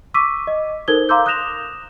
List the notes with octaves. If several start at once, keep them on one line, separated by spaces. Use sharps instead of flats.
C#6 D6 E6 B6 D#7
D#5
D#4 A4 A#4 C5 G#6 G7
F5 A#5 C6 D6 E6 G6
D#6 F#6 G6 A#6 E7 F7